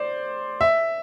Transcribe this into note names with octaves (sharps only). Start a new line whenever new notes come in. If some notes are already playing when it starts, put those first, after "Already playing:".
Already playing: C5 D5
E5